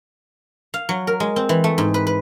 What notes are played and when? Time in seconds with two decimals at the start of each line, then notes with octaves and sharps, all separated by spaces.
0.74 F5
0.89 F#3
1.07 A#4
1.20 G#3
1.36 C4
1.49 E3
1.64 A3
1.78 G#2
1.94 B4
2.07 B4